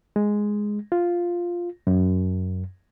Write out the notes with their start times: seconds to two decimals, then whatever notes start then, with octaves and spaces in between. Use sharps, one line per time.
0.16 G#3
0.92 F4
1.87 F#2